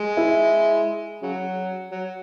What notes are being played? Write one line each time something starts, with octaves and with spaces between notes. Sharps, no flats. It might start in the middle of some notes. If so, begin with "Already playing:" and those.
Already playing: G#3
E4
C#3 F#3
F#3